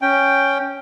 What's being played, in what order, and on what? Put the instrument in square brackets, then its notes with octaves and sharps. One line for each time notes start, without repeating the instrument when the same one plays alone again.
[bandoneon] C#4 G5